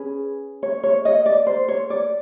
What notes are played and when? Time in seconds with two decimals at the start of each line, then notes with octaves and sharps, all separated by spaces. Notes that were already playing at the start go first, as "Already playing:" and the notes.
Already playing: C#4 G#4 B4
0.63 C#5
0.84 C#5
1.05 D#5
1.26 D5
1.47 C5
1.68 C#5
1.90 D5